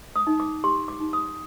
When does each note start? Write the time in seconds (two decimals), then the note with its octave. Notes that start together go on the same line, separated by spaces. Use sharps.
0.16 D#6
0.27 D#4
0.40 D6
0.64 G4 C6
0.88 D6
1.00 D#4
1.13 D#6